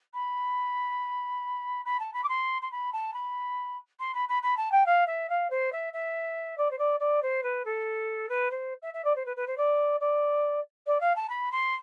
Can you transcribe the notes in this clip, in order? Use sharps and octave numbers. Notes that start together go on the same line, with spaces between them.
B5
B5
A5
B5
D6
C6
C6
B5
A5
B5
C6
B5
B5
B5
A5
G5
F5
E5
F5
C5
E5
E5
D5
C5
D5
D5
C5
B4
A4
B4
C5
E5
E5
D5
C5
B4
B4
C5
D5
D5
D5
F5
A5
B5
C6